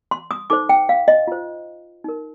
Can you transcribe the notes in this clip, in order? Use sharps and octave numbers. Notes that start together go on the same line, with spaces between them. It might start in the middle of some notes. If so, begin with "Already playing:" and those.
C6
D#6
D#4 A4 C5 D6
G5
F5
D#5
F4 C5
D#4 A#4